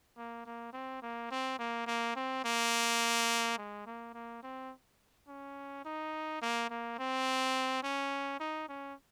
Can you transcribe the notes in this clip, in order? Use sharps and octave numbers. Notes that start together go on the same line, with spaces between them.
A#3
A#3
C4
A#3
C4
A#3
A#3
C4
A#3
G#3
A#3
A#3
C4
C#4
D#4
A#3
A#3
C4
C#4
D#4
C#4